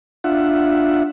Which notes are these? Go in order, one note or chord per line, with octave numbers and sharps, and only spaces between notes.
D4 F4 E5 F#5